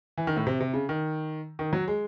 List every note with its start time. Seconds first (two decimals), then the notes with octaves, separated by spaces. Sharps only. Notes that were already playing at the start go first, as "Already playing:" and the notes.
0.17 E3
0.27 D#3
0.37 A2
0.47 C3
0.60 C3
0.74 C#3
0.89 D#3
1.59 D#3
1.73 F#3
1.88 G#3